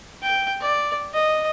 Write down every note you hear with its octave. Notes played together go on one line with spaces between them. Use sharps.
G5
D5
D#5